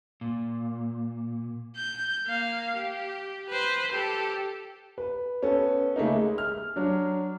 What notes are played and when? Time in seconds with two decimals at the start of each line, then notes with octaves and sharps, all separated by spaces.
0.21 A#2
1.76 G6
2.26 A#3 F5
2.77 G4
3.50 B4 C5
3.92 G4 A4
4.98 B4
5.42 B3 C#4 A4
5.96 C#3 A3 A#3 D#4
6.15 G#3
6.38 F6
6.76 F#3 D4